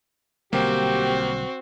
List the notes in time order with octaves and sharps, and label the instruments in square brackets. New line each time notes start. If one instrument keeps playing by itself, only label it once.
[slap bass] B1 D3 G3 [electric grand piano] A#3 [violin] C4 F#4 [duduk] G4